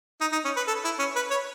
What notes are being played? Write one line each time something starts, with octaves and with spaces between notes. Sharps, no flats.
D#4
D#4
C#4
B4
A4
E4
C#4
B4
C#5